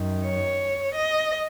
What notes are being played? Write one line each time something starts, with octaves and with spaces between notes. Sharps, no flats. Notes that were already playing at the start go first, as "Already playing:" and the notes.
Already playing: F#2 D#3
C#5
D#5